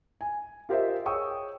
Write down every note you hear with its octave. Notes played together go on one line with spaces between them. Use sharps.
G#5
F4 G4 A#4 C5 D#5 E5
G#4 C#5 G5 C#6 D#6 E6